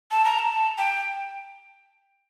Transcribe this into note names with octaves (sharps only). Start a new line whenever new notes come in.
A5
A#5
A5
G5